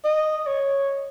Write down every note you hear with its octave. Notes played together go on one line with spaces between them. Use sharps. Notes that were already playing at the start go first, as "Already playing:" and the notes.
D#5
C#5